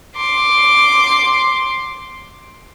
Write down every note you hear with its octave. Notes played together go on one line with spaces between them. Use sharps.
C6 D6